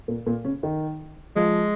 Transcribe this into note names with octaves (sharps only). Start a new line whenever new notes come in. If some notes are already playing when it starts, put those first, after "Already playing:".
A#2 A#3
A#2 A#3
C#3 C#4
D#3 D#4
F3 G#3 F4